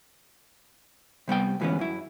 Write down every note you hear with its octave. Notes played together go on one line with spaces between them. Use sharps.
C3 G3 B3 G5
D2 G2 E3 G#3 B3 C#4
F#2 E4